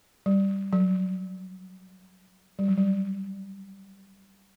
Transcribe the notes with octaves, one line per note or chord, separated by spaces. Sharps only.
G3
F#3
G3
F#3
G3